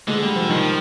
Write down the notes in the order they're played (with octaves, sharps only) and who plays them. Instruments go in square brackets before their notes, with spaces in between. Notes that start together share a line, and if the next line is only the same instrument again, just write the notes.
[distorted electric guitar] D3 [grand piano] G#3
[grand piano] G3
F3
[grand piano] D#3 [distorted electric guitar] F3